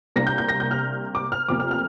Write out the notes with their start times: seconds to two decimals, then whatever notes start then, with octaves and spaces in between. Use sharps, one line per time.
0.16 C2 C3 A#3 D4 A#6
0.27 G6
0.38 G6
0.49 A#6
0.60 G6
0.71 F6
1.15 D6
1.32 F6
1.48 F1 F2 C3 A#3 D6
1.60 F6
1.71 F6